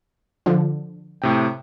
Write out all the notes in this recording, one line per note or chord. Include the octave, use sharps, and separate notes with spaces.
D3 F3
A2 C3 G5